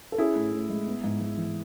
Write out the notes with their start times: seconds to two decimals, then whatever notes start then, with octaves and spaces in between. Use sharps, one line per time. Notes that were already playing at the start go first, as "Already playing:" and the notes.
0.12 A4
0.18 C#4 E4 G#4
0.36 A2
0.52 A2
0.70 G#3
0.87 B3
1.04 G#2
1.21 G#2
1.37 E3